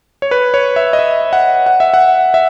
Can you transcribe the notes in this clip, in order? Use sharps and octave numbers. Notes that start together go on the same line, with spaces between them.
C#5
B4
C#5
E5
D#5
E5
F#5
F#5
E5
F#5
E5